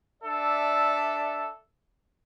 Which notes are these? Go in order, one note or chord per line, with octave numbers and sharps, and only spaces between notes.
D4 A4 D5 E5